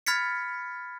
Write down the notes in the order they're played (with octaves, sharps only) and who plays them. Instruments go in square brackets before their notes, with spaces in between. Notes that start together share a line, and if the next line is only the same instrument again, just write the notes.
[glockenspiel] B5 F6 G#6 A6 B6 C#7